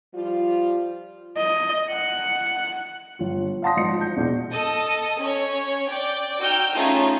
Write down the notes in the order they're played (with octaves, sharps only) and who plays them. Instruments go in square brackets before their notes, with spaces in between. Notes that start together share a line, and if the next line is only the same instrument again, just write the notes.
[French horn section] F3 G3 F4
[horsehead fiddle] D#5
F#5
[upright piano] G1 F4
F5 F#5 A5 C6 D#6 A#6
G#1 F3 D#5 C#7
G6
E2 B2
[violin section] A4 D#5
C#4 C#5
D5 G5
D#4 F#4 G5 E6 F6 G6
A3 C#4 D#4 F4 G#4